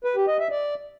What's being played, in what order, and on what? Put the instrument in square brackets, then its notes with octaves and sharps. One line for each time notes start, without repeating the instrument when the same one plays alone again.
[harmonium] B4
G4
D#5
E5
D5